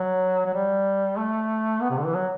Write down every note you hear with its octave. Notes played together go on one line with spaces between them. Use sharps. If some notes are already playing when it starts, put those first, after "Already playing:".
Already playing: F#3
F#3
G3
A3
B3
C3
D3
E3
F#3